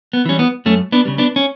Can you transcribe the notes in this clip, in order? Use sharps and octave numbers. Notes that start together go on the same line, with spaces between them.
B3
E3 G3 C#4
B3
F#2 A3 C#4
B3 D4
C#3 G3
B3 D4
C#4